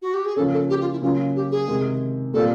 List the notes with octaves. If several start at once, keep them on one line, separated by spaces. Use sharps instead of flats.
F#4
G4
G#4
C#3 F3 A#3 C#4 A4
A4
G4
F4
E4
C#3 F#3 A#3 C#4 F4
G4
G#4
C3 D#3 G#3
A#2 G3 C4 F4 A4